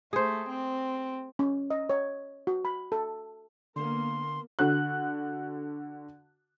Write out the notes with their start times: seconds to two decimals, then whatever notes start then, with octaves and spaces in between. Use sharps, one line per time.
0.13 A3 G#4 C5
0.49 C4
1.39 C#4
1.70 D#5
1.90 C#5
2.47 F#4
2.65 B5
2.92 A4
3.76 D3 A#3 B3 A#4 C6
4.59 D3 F#4 F#6